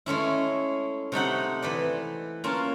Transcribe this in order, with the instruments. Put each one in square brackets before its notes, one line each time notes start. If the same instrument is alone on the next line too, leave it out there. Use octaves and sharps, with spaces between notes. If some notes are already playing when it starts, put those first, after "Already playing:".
[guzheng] G#3 A3 C#4 E4
C3 A3 D#4 F#5
E3 B4 D5
A#3 C#4 F4 A5